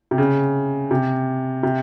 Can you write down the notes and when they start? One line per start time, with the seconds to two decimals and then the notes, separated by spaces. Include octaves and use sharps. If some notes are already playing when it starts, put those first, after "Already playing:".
0.11 C3
0.18 C#3
0.91 C3
1.63 C3